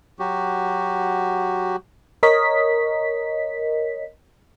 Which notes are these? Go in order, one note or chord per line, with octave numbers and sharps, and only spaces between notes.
F#3 F#4 G4
A#4 C#5 D#5 B6